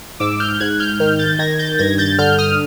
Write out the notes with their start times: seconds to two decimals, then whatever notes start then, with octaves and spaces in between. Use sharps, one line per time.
0.20 G#2 D6 E6
0.40 F6 G6
0.60 G#2 F#6 G#6
0.80 F6 G6
1.00 D#3 F6 G6
1.19 G6 A6
1.39 D#3 G#6 A#6
1.59 G6 A6
1.79 G2 G#6 A#6
1.98 G6 A6
2.18 D3 F6 G6
2.38 D#6 F6